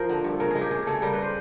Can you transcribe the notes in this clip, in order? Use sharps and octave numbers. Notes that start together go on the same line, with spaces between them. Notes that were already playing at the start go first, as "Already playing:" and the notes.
Already playing: F3 A#4 C5
D3
G2
C#3 A#4
G#3 G#4
G4
C#3 G#4
C#3 A4
G3 A#4
B4
C5